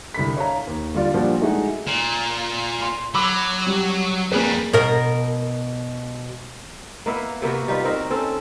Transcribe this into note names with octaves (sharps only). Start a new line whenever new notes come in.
C2 D3 B5 B6
C#5 F5 A#5
D#2
D3 G3 F4 D5
A#2 F3 G3 D4 F4 F#4
G#3 A3 D#4 E4 F#4 G#4
A#2
C6
F#3 B5 D6 E6
G3
F2 G3 A#3 G#4 B4
B2 A#4
A#3 B3 E4
C3 A#3 B3 F#4
G3 D#4 F4 B4
C4 D#4 F#4 A#4
C4 C#4 A4